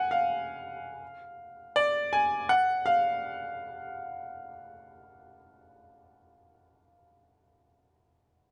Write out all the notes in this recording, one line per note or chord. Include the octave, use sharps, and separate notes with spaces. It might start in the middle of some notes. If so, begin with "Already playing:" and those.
Already playing: F#5 G#5
F5
D5
G#5
F#5
F5